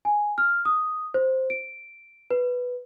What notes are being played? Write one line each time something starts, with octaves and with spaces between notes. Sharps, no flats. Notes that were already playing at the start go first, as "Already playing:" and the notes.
G#5
F6
D#6
C5
D7
B4